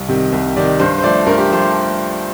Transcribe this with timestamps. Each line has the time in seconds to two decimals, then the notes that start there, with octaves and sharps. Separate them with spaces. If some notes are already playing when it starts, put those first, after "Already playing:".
Already playing: C2
0.09 C3 D#3 G3
0.32 C2
0.57 C3 D#3 G3 D5
0.80 G2 C5
0.98 C5
1.03 F3 A3 D5
1.26 G2 A#4
1.38 G4
1.50 F3 A3 C5